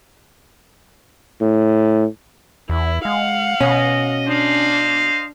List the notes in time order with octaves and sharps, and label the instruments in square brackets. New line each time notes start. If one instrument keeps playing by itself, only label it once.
[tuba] A2
[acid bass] E2 [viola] E4
[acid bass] G#3 [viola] F5 F#5
[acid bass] B2 [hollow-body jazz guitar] C#4 [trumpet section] D#5
[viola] D4 [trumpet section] C5 D#5 F5